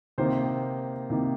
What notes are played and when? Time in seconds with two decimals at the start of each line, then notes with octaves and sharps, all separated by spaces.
0.18 C3 D#3 A#3 C5
1.10 C3 D#3 A#3